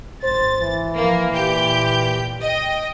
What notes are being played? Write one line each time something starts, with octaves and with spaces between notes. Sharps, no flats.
G#1 C5 A6
E3
F3 A#3
A#2 G4 G6
D#5 G5